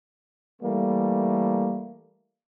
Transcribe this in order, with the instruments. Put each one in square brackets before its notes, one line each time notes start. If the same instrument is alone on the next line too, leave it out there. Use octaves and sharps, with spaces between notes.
[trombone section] E3 G3 A3 A#3